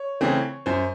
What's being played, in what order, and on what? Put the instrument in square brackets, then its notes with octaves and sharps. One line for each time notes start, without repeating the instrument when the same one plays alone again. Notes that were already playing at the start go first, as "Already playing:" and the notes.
Already playing: [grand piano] C#5
C#3 E3 A3 C4
F#2 C5